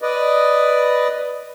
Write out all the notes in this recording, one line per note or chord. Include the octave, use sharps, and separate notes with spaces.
B4 D5 D#5